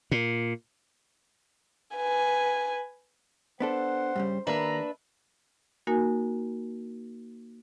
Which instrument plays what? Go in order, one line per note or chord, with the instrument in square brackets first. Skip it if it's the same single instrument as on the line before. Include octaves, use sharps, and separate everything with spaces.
[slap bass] A#2
[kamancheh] B4 G#5
[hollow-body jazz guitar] B3 D4 A4 [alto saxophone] C5 [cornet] F#5
[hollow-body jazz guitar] G2 C#3 G3
[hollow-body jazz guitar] D#2 A#3 [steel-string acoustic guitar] D4 B4 E5 [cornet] A#5
[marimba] A#3 D#4 F#4 A#4 G#5